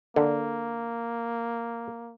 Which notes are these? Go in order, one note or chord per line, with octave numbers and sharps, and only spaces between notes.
D3 A#3